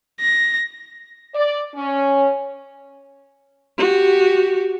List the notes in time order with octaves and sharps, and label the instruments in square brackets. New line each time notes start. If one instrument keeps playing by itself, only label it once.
[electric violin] A#6
[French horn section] D5
C#4
[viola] F#4 G4